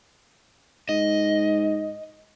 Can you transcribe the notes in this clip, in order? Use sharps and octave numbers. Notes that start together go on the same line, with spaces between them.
G#2 D#5